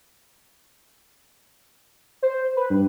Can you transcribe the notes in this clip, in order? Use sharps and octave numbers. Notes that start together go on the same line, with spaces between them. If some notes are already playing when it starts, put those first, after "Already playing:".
C5
B4
G2